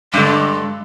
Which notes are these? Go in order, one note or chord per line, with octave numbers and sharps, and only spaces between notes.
G2 D3 G#3